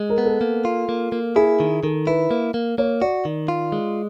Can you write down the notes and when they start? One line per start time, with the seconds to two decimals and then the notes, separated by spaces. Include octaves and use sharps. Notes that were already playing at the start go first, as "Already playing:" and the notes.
Already playing: G#3
0.09 A#4
0.18 B3
0.25 A4
0.41 A#3
0.65 F4
0.89 A#3
1.12 A#3
1.36 E4 G#4
1.60 D#3
1.83 D#3 A4
2.07 E4 B4
2.31 A#3
2.54 A#3
2.78 A#3 C#5
3.02 F#4 D5
3.25 D#3
3.48 F4
3.72 G#3